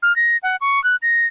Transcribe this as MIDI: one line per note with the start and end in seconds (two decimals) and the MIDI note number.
0.03 0.15 89
0.16 0.37 94
0.43 0.56 78
0.61 0.82 85
0.84 0.96 90
1.02 1.26 94